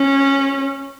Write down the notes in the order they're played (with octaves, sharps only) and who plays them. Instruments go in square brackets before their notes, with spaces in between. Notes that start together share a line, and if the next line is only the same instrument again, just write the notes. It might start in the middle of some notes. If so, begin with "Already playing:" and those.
Already playing: [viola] C#4